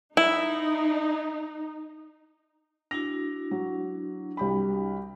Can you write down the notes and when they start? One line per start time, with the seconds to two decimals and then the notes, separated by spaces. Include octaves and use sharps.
0.17 D#4 E4
2.91 D4 E4 F#4 A#6
3.51 F#3
4.37 C2 G4 B5